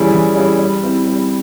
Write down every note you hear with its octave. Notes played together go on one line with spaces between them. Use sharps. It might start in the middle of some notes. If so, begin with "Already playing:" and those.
Already playing: E3 G3 C#4 E4 G#4
E3
G3 C#4 E4 G#4
G3
C4 E4
G3